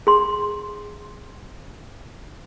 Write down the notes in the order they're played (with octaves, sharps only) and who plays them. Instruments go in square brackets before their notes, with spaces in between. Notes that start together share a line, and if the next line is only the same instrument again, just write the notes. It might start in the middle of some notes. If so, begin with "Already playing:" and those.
[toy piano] G#4 C6